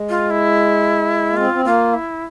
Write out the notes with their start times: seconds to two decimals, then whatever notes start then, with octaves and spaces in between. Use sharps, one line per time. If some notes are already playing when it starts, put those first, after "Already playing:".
Already playing: G#3
0.09 F4
0.30 E4
1.31 A#3
1.37 C4 F4
1.53 C4
1.65 A#3 F4
1.94 E4